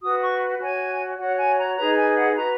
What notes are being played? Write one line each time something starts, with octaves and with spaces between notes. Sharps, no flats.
F#4 B4 D#6
C#6
F#4 C#5 G#5
F#4 C#5 F#5
G#5
A#5
D#4 G#4 B4 A#5
G#5
F#5
F#4 B4 A#5